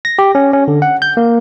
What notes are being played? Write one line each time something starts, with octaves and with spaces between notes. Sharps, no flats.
A#6
G4
C#4
C#4
D3
F#5
G6
A#3